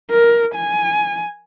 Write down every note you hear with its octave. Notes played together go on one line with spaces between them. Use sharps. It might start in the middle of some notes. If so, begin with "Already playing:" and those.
A#4
G#5